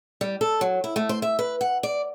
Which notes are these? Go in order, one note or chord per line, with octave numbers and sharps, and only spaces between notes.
G3
A4
F#3
E4
A3
C5
E5
B4
F#5
D5